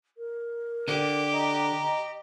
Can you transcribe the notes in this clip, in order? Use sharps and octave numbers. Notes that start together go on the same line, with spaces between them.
A#4
D3 G4
D#5 A#5